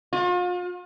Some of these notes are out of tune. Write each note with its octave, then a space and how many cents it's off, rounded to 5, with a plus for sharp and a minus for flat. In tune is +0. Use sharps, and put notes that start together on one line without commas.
F4 +40